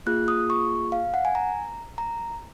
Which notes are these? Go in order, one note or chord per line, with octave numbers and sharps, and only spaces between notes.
A#3 F4 G#4 F#6
D#6
C#6
F5
F#5
G#5
A#5
A#5